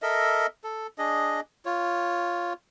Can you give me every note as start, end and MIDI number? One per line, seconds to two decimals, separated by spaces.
0.02 0.47 69
0.02 0.47 70
0.02 0.47 75
0.02 0.47 76
0.64 0.87 69
0.98 1.40 62
0.98 1.40 68
0.98 1.40 75
1.65 2.53 65
1.65 2.53 73